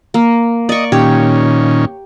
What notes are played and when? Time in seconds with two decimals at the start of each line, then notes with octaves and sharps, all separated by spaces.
0.14 A#3
0.69 D5 D#5 C#6
0.92 A#2 D#3 C#4 G4 C#5